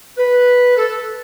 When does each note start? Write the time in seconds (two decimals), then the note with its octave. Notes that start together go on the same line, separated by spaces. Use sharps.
0.18 B4
0.76 A4